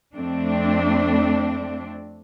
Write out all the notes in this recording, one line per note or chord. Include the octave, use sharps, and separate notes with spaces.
F2 A3 C4 D4